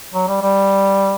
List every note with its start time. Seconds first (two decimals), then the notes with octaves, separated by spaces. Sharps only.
0.14 F#3
0.28 G3
0.42 G3